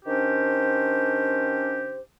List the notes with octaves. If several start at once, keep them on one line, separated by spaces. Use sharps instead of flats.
D#3 C#4 D4 G4 C5